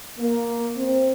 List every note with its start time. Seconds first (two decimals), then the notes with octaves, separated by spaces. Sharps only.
0.19 A#3
0.76 C4